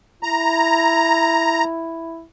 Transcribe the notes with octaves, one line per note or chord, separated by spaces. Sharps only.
E4 A#5